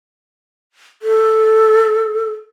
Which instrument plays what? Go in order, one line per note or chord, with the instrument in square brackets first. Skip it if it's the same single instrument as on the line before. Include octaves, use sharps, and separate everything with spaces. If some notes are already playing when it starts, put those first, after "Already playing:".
[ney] A4